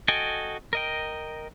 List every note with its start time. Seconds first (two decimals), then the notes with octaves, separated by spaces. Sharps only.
0.08 F#4 A4 D#5 G5 G#5
0.73 A#4 D#5 G5